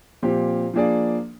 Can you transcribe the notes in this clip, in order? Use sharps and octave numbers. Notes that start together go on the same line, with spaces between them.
A#2 F3 C4 G4
F3 A#3 D4 G#4 D5